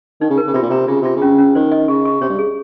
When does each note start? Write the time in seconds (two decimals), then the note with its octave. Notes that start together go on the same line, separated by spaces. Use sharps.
0.21 D#3 D#4
0.30 C#3
0.38 A#4
0.47 C#3
0.54 C3 F4
0.62 A#2
0.70 C3 A#5
0.88 C#3 F4
1.02 C3 F4
1.16 C#3
1.22 C#4
1.38 C#4
1.55 D#3 C5
1.72 D#5
1.88 C#3 C#6
2.05 C#6
2.21 C3 C#5
2.29 G2
2.39 G#4